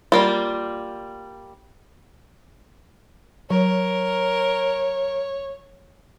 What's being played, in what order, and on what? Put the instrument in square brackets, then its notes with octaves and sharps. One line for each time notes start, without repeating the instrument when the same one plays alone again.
[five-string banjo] G3 A#3 F4
[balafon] F#3 [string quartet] A#4 [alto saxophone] C#5